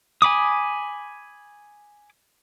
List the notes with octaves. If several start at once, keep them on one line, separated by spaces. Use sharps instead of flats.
G#5 B5 D6 D#6